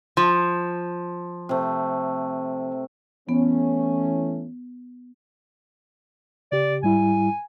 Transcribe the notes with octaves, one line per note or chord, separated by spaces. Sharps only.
F3
C3 A3
E3 A3 B3 C#4
C#3 G4 D5
G#2 G3 E4 G#5